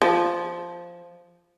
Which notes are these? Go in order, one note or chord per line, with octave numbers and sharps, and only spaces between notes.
F3